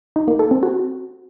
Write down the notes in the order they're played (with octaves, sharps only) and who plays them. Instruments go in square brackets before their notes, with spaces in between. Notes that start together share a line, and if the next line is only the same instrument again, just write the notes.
[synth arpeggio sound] D#4
A#3
A4
C4
F#4